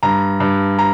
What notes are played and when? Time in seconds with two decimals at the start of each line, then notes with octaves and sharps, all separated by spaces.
0.03 G2 A#5
0.40 G2
0.79 A#5